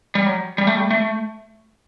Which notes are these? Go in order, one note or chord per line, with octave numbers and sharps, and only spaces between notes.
G3
F#3
G3
A3
G3
A3